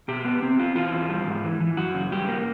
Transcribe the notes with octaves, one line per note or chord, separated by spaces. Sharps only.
B2 G4
B3
C4
F4
E3 F4
E2
G3
G#2
E3
E3
F#2 F#4
C#3
G2 G4
A#3